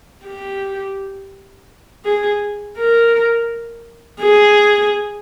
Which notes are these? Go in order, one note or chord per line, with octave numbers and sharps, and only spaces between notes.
G4
G#4
A#4
G#4